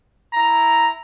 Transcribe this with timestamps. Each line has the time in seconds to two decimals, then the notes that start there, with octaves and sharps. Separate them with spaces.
0.34 E4 A#5